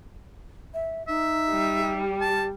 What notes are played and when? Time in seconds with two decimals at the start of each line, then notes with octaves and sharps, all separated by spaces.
0.74 E5
1.08 D#4 E5
1.50 G3
1.81 G4
2.21 A5